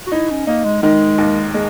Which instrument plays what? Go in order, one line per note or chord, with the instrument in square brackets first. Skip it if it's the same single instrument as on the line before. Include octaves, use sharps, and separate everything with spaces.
[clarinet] F#4
[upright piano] D#4 [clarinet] E4
[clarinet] C#4
[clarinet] A#3 [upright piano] D#4
[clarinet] G#3
[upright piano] D#3 [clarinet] G#3
[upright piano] D#2
G#3